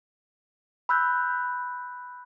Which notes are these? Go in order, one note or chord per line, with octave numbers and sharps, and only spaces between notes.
B5 E6 F#6 G6